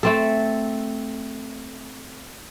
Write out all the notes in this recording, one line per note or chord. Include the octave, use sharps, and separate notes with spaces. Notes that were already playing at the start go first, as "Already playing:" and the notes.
A3 C4 A4